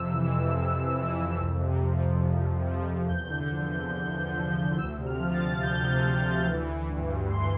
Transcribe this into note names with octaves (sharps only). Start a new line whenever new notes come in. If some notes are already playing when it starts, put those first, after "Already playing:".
Already playing: F2 C3 E6
E3
F2
F2
C3
E3
F2
C2
C3
F3
C2
C2
C3
F3
C2
E2 G6
D3
F3
E2
E2
D3
F3
E2
D2 E6
C3
F6
F3
A6
D2
D2 G6
C3
F3
D2
E3
E3
G2
G2
E3 C6